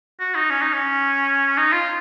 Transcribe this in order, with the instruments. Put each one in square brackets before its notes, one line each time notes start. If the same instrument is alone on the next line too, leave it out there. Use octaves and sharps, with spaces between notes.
[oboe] F#4
D#4
C#4
D#4
C#4
D#4
F4